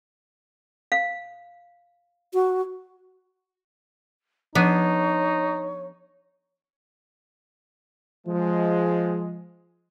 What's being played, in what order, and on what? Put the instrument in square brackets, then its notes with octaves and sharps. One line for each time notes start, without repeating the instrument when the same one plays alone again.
[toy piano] F5
[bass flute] F#4
[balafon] F3 [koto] B3 D4 G#4 [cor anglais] D#4 [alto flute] C#5
[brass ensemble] F3 G#3